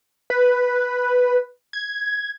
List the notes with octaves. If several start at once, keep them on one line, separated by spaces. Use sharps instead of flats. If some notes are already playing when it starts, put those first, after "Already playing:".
B4
G#6